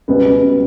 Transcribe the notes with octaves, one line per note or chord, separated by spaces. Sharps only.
C#2 B2 G3 B3
C#2 B2 G3